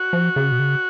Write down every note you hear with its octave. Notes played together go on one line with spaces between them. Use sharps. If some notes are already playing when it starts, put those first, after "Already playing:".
Already playing: F#4
F3
C#3
B2
C#3